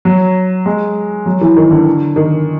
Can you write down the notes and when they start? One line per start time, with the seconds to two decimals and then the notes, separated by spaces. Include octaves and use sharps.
0.05 F#3
0.66 G#3
1.26 F#3
1.41 E3
1.56 D#3
1.71 D3
2.16 D#3